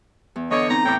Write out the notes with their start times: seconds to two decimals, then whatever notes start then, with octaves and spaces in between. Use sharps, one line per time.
0.36 E2
0.51 D3 B3 A4 C#5 D#5 D6
0.70 C4 D#4 A#5
0.85 A2 C#5 G5 D6